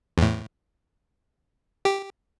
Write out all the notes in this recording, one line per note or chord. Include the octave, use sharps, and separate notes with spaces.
E2 A2
G4